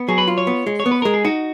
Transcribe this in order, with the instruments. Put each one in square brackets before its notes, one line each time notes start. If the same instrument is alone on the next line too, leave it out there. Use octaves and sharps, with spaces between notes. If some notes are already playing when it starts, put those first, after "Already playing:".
Already playing: [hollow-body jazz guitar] B3
[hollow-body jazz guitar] F#3 [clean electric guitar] G#4
[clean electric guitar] B4
[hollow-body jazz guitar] F4
[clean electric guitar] C#5
[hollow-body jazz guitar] B3
G#3
[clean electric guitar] C#5
[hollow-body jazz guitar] B3
[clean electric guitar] B4
[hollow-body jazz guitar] G#3 [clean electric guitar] A#4
[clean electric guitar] G#4
[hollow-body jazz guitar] D#4 [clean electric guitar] F#4